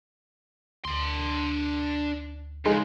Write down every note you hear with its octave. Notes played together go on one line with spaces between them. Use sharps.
D2 D4 C6
C#3 G#3 D#4 G#4 D#5